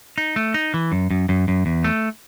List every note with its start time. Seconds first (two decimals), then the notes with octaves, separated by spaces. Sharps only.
0.18 D#4
0.36 A3
0.54 D#4
0.74 E3
0.92 F#2
1.11 F#2
1.29 F#2
1.48 F#2
1.66 E2
1.84 A3